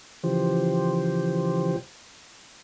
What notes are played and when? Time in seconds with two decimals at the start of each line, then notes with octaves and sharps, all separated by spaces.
0.24 C#3 E3 F3 G4 C5